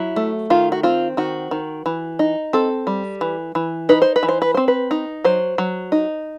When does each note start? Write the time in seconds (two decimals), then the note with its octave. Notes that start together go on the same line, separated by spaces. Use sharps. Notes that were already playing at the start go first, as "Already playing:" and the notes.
Already playing: F#3 E4
0.16 A3
0.50 D#3 F4
0.72 F#4
0.83 C4 F4
1.17 D#3 F#4
1.51 D#3
1.86 E3
2.19 D#4
2.53 C4 A4
2.87 G3
3.21 E3
3.55 E3
3.89 D#4 B4
4.02 C5
4.16 B4
4.23 E3
4.29 C5
4.42 B4
4.54 C4 C5
4.68 B4
4.91 D#4
5.24 F#3 C5
5.58 F#3
5.92 D#4